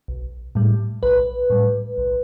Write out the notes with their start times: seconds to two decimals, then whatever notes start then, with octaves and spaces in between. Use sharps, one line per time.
0.08 B1
0.55 A2 G3
1.03 B1 B4
1.50 A2 G3
1.98 B1